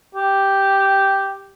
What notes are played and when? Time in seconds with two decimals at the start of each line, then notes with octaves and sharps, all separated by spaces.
0.15 G4